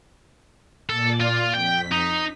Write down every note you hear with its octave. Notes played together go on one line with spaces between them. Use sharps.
A#2 A4 D5
F4
F2 G5 B6
D#4